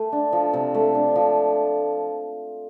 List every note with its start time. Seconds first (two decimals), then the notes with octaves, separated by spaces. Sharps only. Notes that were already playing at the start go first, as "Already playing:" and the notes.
Already playing: A3
0.12 D4
0.33 F3
0.53 C3
0.74 A3
0.95 D4
1.16 F3